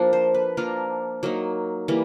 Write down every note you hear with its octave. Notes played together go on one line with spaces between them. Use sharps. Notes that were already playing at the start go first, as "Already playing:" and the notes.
Already playing: F3 A#3 D4
C5
B4
F3 A#3 D4 F4 A#4
F#3 A#3 D#4
E3 G3 A#3